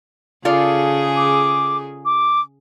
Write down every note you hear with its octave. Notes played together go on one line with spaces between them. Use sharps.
C#3 F4 G#4 A4 D5
D6
D6